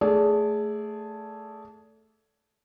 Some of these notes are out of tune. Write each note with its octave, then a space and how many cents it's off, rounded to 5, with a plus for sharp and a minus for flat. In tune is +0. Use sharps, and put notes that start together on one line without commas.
A3 +0 G#4 +5 D5 -30